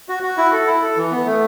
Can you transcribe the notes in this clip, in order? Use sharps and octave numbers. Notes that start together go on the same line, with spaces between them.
F#4
F#4
E4
A4
E4
A4
E3
B3
A3